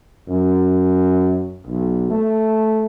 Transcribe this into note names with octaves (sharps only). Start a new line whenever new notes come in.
F#2
B1
A3